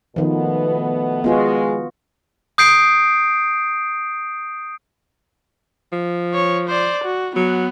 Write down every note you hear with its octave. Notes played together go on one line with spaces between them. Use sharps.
B2 D#3 F3 A3 B3
G#3 B3 F4 F#4
D#6 G6 C7 D7
F3
C#5
C5 D5
F#4
F#3 B3